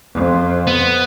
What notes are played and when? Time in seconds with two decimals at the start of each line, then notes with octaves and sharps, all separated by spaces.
0.14 F2
0.67 B3